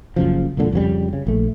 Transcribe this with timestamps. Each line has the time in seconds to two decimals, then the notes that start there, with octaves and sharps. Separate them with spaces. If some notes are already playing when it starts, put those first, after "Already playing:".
0.16 F#1 F#2 C#3 F3
0.57 C2 F2 A#2 D3
0.72 F2 C#3 E3 G3
1.13 C#3
1.27 A#1 A3